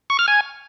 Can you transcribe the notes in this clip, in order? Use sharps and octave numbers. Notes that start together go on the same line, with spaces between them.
C#6
F6
G#5